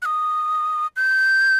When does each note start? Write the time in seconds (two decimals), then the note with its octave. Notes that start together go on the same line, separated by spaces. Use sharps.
0.02 F#6
0.05 D#6
0.96 G6